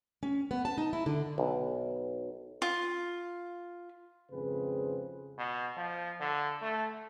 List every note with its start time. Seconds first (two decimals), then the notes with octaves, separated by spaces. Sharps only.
0.23 C#4
0.51 B3
0.65 A5
0.78 D#4
0.93 E4
1.06 D3
1.38 B1
2.62 F4
4.32 G#1 F2 C#3 C4 G#4 B4
5.38 B2
5.77 F3
6.20 D3
6.62 A3